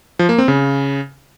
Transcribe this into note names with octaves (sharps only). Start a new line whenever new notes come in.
F3
A#3
C4
C#3